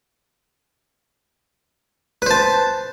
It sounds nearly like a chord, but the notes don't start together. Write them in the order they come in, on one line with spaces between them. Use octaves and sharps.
B4 C5 A5